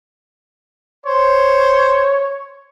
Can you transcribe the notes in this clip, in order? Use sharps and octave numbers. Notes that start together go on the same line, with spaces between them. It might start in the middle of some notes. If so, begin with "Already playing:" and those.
C5 C#5